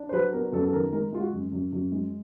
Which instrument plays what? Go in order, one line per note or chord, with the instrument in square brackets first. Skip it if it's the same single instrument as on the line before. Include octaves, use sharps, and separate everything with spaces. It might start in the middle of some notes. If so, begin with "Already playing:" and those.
Already playing: [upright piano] D4
C5
F#3 B4
B3 A#4
F#2 A4
A4
D#3 A#4
G#3 A#4
G#3 F4
F#4
F#2
F#2
F#2
G#3